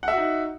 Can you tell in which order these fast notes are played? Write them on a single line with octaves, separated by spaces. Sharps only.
F#5 E5 F#4 D#4